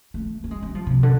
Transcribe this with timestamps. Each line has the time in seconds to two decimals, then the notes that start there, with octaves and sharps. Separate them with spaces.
0.14 A3
0.44 A3
0.51 G#3
0.63 G3
0.75 F3
0.87 C3
1.03 D3